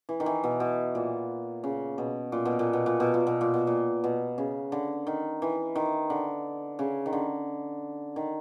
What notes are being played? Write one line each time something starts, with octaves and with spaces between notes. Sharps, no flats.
E3
D#3
E3
B2
B2
A#2
C#3
B2
A#2
B2
A#2
B2
A#2
B2
A#2
B2
A#2
B2
A#2
B2
C#3
D3
D#3
E3
D#3
D3
C#3
D#3
D3
D#3